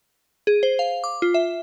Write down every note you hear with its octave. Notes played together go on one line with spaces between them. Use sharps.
G#4
C5
F5
D6
F4
E5